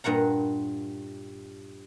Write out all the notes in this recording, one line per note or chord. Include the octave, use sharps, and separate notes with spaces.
G2 A#2 F#5 A#5